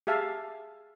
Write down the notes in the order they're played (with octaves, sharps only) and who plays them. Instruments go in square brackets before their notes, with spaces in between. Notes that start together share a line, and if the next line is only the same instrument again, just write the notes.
[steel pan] G4 G#4 E5 F5 A5